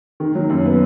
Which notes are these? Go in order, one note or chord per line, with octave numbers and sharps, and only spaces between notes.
D#3
F#3
F#2
B3